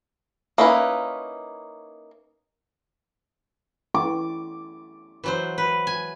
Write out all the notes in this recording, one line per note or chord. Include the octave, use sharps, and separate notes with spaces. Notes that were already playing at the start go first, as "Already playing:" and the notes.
A#3 C#4 D#4 E4 B4
D6
E3 F#3 C5
B4
G#5